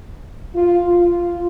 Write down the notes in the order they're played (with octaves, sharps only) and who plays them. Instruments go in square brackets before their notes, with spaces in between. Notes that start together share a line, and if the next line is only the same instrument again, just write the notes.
[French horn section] F4
F4